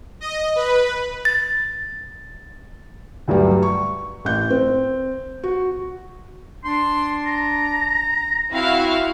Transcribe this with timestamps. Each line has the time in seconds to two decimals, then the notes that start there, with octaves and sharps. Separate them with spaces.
0.21 D#5
0.56 B4
1.25 A6
3.28 D2 G2 F#3 G3 G4
3.63 C#6
4.25 A1 G6
4.50 C4
5.43 F#4
6.64 D4 C6
7.26 A#5
8.53 C4 E4 F#4 F5